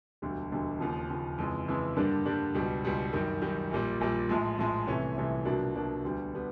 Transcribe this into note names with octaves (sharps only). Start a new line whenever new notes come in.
E1 D2 D3 G3
E1 D2 D3 G3
D#2 C#3 F3
D#2 C#3 F3
F2 C#3 E3 G#3
F2 C#3 E3 G#3
G2 D3 G3 A#3 D4
G2 D3 G3 A#3 D4
C#2 B2 G3
C#2 B2 G3
F#2 D#3 G3
F#2 D#3 G3
A#1 A#2 G3
A#1 A#2 G3
A#1 A2 F3 G#3
A#1 A2 F3 G#3
C2 C3 E3 A3 C#4
C2 C3 E3 A3 C#4
C2 B2 F#3 A#3 D4
C2 B2 F#3 A#3 D4
D2 D3 G3 B3
D3 G3 B3